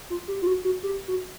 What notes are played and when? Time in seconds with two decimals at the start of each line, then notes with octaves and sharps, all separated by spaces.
0.10 F4
0.28 G4
0.42 F4
0.47 F#4
0.65 F#4
0.83 G4
1.08 F#4